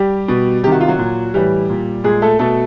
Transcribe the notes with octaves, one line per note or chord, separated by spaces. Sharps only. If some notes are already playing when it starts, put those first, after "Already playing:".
Already playing: G3 G4
B2
C3 D#3 G4
F#4
F4
F#3 F#4
A#2
A2 E3 G3 G4
A#2
A#2 G#3 G#4
A3 A4
B2 A3 A4